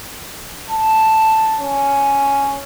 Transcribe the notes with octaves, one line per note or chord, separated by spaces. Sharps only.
A5
C#4